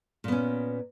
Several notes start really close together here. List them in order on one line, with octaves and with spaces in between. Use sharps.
A#2 B3 C#4